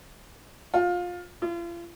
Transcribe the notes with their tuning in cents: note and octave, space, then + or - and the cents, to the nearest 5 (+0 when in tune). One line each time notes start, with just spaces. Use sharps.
F4 +20
F4 -40